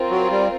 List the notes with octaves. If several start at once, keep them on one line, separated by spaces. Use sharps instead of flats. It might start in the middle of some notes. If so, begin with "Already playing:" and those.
Already playing: C4 F4 A#4
F#3
G3